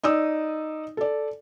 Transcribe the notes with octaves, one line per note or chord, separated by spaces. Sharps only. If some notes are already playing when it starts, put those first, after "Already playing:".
D#4 D5 D#6 E6
A4 D5